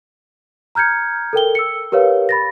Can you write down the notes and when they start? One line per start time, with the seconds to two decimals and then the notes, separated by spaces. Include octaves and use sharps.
0.75 A#5 F6 G6 G#6 C#7
1.33 A4 A#4 G5 G7
1.55 E6 C#7
1.92 G4 A#4 B4 C#5 F5
2.29 B5 A6 A#6